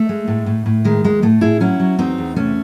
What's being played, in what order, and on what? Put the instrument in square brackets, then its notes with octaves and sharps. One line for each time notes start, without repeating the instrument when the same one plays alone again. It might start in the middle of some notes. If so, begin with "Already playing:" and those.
Already playing: [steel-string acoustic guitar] A3
G#3
A2
A2
A2
D#3 G#3
D#2 G#3
A2 A3
A2 E4 G#4
F#3 C#4 E4
F#3
E2 C4 D#4
E2
C3 A3 C#4